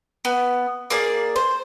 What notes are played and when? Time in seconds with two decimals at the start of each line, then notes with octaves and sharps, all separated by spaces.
0.25 B3
0.90 A#3 G#4 D5
1.36 C5